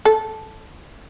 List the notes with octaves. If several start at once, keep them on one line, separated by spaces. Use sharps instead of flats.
A4